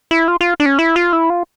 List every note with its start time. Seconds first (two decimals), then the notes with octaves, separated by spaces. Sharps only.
0.11 E4
0.28 F4
0.41 F4
0.60 D4
0.66 C#4
0.79 E4
0.96 F4
1.13 E4
1.30 F4